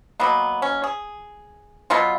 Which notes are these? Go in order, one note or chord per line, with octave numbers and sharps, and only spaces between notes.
B2 F#3 A#3 B3
C#4
G#4
B2 F#3 B3 F4